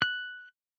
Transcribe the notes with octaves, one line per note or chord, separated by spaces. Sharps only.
F#6